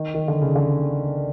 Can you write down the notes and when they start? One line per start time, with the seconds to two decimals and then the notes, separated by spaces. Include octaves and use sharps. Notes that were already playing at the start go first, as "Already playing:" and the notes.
Already playing: D#3
0.15 D#3
0.28 D3
0.42 C#3
0.56 D3